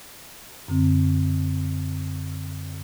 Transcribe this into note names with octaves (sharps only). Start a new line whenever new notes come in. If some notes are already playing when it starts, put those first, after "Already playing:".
F#2 D3 C4